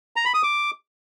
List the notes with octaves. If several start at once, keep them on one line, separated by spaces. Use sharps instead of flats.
A#5
B5
D#6
D6